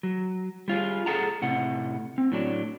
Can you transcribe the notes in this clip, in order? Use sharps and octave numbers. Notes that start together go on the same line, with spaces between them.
F#3
G3 F4 G#4
G#4 A4 F#5 A5 A#5
A2 C3 F#5
C4
A2 F#3 D4